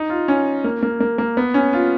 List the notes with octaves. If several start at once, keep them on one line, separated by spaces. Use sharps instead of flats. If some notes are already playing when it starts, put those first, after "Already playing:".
Already playing: D#4
F4
C#4
A#3
A#3
A#3
A#3
B3
C#4
F4